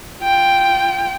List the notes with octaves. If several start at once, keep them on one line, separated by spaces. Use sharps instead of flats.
F4 G5